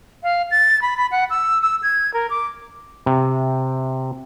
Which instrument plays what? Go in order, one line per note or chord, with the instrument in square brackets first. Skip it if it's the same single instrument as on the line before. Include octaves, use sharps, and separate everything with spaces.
[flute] F5
A6
B5
B5
F#5
E6
E6
G#6
A#4
D6
[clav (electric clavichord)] C3